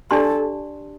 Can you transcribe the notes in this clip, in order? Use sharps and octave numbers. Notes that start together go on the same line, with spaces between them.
D4 G4 A4 D5 A5 C6